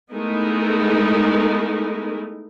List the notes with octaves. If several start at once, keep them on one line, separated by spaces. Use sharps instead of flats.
G#3 A3 B3 D#4 E4 A#4